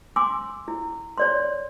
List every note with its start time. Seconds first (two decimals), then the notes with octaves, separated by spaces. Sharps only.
0.16 G#5 C6 D6 E6
0.68 E4
1.18 C#5 D5 C6